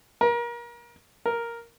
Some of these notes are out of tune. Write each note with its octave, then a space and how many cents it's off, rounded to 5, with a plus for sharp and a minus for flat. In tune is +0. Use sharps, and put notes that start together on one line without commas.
A#4 +30
A#4 +0